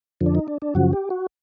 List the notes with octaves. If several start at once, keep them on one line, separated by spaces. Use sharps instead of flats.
F2 D3 F3
D4
D#4
D4
D4
F#2 C#3 F3 F#4
G4
F#4